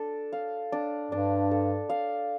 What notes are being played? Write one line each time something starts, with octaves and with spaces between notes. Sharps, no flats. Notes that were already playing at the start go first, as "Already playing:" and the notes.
Already playing: D4 A4
F5
D4
G2 D4
A4
F5